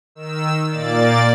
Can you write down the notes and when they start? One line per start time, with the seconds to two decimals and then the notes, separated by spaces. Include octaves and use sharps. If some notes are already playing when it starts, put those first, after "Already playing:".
0.15 D#3 E6
0.70 A#2 A#3 D5 A6